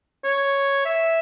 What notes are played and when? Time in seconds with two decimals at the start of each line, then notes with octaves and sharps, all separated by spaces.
0.24 C#5
0.85 E5